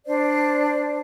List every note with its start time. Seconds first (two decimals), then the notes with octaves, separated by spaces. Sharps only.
0.07 D4 C5 D5